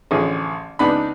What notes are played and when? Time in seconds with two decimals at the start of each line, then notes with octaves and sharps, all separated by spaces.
0.11 A1 D3 F3 C#4 G#4
0.79 C#2 B3 D4 D#4 B5